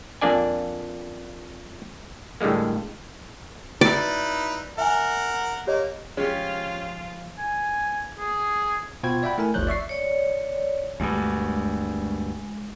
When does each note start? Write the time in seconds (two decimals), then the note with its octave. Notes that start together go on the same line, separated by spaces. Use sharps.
0.21 F2 A#3 D4 D5 G#5
2.41 A2 D3 G3 G#3 A#3
3.81 D#4 E4 F#4 B4 D5 E6
4.78 A#4 E5 F#5 G#5
5.67 A#3 G4 C#5 D#5
6.17 F3 G#3 C#4 F4 G4 G#4
7.38 G#5
8.19 G#4
9.03 B2 F4 C5 G5 G#6
9.23 D5 E5 F#5 G5 B5
9.38 A3 E4 A#4 G#5
9.54 G1 D2 F3 C#5 F#6 G6
9.67 D5 E5 C#6 C7
9.89 C#5 D5
11.00 D2 G2 G#3